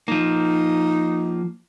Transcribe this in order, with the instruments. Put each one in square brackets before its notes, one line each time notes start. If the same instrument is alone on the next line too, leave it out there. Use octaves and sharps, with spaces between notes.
[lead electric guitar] F3 A#3 [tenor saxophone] D#4